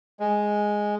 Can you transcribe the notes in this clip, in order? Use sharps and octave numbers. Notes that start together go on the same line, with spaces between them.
G#3